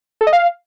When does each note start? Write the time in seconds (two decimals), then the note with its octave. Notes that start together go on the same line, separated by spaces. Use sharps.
0.21 A4
0.27 D#5
0.33 F5